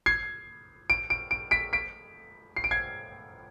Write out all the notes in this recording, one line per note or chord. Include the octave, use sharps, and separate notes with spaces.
G#6 C7
D7
D7
D7
B6 D7
B6 D7
C7
D7
G#6 C7